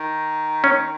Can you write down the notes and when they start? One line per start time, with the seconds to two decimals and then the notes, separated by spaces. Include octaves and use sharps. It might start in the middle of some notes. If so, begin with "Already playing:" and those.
Already playing: D#3
0.64 C#4